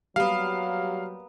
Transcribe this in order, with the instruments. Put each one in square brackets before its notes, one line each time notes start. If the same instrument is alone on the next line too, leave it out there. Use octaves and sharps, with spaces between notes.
[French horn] F#3 [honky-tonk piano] G3 [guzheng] A#3 B3 [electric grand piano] F5